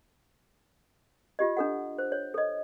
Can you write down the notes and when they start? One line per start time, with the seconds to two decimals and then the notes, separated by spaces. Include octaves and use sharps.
1.39 F4 G4 D#5
1.57 D4 A4 F#5
1.99 C5
2.12 C#5
2.34 A4 D#5